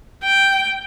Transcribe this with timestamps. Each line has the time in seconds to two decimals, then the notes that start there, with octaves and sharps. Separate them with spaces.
0.23 G5